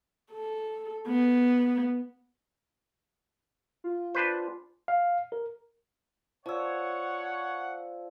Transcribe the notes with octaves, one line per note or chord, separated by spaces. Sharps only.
A4
B3
F4
D4 B4 C5
F5
A#4
F3 C#5 D5 F#5 E6